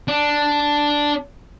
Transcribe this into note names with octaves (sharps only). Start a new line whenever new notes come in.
D4